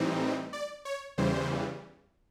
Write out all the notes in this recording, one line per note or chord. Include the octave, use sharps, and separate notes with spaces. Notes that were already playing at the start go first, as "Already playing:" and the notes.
Already playing: A2 E3 G3 C4 D#4
D5
C#5
E2 C#3 E3 G3 C5